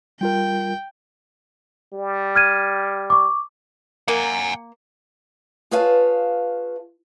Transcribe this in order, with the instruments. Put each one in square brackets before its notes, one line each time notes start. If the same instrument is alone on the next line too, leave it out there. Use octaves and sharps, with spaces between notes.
[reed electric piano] G3 F4 A#4 [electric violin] G5
[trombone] G3
[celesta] F6 G#6 D#7
C#6 D6
[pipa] A#3 [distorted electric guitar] F#5 G#5
[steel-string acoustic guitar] F4 G#4 B4 C#5 F5 A5